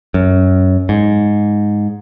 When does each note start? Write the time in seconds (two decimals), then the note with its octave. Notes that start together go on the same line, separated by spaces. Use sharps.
0.14 F#2
0.89 G#2